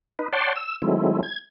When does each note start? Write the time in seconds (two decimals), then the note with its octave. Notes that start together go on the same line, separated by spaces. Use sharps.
0.19 D#4 B4
0.33 C#5 D5 F#5 G5 A5 C6
0.56 E6
0.82 D#3 F#3 G#3 A3 C4 E4
1.23 G#6